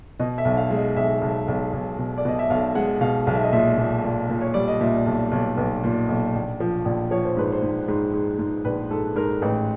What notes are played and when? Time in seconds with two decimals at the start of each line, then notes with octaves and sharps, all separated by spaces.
0.19 B2 D#5
0.38 E5
0.45 B1
0.57 F5
0.70 G#3
0.77 D#5
0.96 B1 E5
1.21 B1
1.48 B1
1.73 B1
1.98 B2
2.18 D5
2.25 B2 D#5
2.39 E5
2.50 B1 F5
2.75 G#3 F#5
3.01 B2 F5
3.27 B1 F5
3.35 E5
3.44 D#5
3.52 A#2 E5
3.78 A#2
4.04 A#2
4.30 A#2
4.41 C#5
4.54 G3 D5
4.68 D#5
4.81 A#2 E5
5.06 B1
5.32 B1
5.57 B1 B4
5.84 A#2
6.09 B1
6.34 A#1
6.60 F3
6.85 A#1
7.11 F3 C#5
7.25 C5
7.37 G#2 B4
7.52 C5
7.62 G#2
7.88 G#2
8.14 G#2
8.39 G#2
8.65 A#1 B4
8.91 G#2 A4
9.16 G#2 A#4
9.42 A1 B4